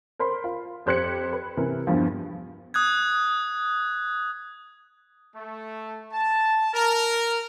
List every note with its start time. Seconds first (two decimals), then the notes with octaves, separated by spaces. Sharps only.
0.19 A#4 C5 B5 C6
0.44 F4
0.86 F2 G4 C5 F#6 G#6 C#7
1.33 B4
1.57 C3 E3 A#4
1.87 E2 G2 F3
2.74 D#6 F#6 G#6
5.36 A3
6.11 A5
6.74 A#4